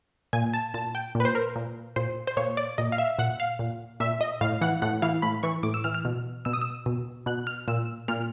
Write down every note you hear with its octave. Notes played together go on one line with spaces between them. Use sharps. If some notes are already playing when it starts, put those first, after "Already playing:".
A#2 G#5
A5
A#2 A5
G5
A#2
B4
C5
A#4
A#2
A#2 C5
C5
A#2 C#5
D5
A#2 D#5
F5
E5
A#2 F#5
F5
A#2
A#2 E5
D#5
A2 F5
E3 F#5
A2 F#5
E3 F5
A2 B5
E3 C#6
A2 D6
E6
E3 F6
F6
B2
B2 E6
D#6
E6
B2
B2 F#6
F6
A#2 E6
A#2 F6